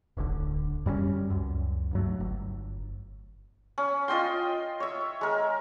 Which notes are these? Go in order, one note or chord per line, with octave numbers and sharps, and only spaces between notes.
D1 G1 D2 D3
F#2 G3 G#3 C#4
C#2 F#2
G2 F#3 A3
G1
C#4
F4 D#5 G5 C6
C#5 E5
G#3 A#4